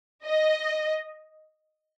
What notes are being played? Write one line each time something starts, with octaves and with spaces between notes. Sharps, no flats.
D#5